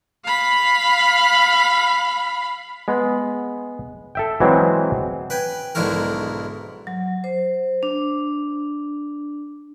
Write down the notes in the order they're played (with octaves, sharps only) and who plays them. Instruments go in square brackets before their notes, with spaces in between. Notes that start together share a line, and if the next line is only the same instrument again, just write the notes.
[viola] F5 B5
[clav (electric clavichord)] G#3 B3
A4 E5 G5
E3 F#3 G#3 C4
[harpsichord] B4 G5 G#5
B1 G#2 D3 E4 F#4 A#4
[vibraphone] F#3
C5
D4